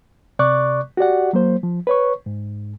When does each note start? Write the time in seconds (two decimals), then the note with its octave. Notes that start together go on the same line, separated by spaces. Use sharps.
0.39 C3 D5 C#6 D6 F#6
0.97 F#4 G4 D5 F#5
1.33 F#3 A#3 C5
1.63 F3
1.87 B4 C#5 C#6
2.26 G#2